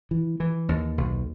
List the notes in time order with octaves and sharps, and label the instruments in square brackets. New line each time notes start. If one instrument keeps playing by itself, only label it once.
[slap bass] E3
E3
D#2
B1